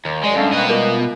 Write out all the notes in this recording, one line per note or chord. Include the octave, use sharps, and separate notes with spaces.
D#2
F#2 G#3 D5 D#5 G#5
F#2 G3 G#3 A4 F5
B2 A#3 C4 D#5 B5 F#6 A#6
A#3 B3 F4 A#4